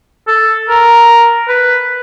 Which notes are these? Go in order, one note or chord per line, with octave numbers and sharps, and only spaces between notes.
A4
A#4
B4